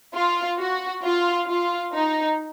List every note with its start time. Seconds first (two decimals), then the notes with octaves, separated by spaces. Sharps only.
0.15 F4
0.59 F#4
1.04 F4
1.47 F4
1.93 D#4